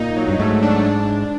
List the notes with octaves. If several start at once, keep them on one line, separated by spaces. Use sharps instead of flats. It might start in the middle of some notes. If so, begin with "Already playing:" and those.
Already playing: A#2 D#4
F#3
G2
G#2 A3
D4
D4
D4